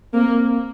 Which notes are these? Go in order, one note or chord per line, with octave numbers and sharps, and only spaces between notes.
A#3 C4